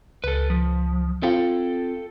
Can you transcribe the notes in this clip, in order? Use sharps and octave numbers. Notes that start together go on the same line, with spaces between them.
C#2 A4 B4
F3
C4 F4 A4 G5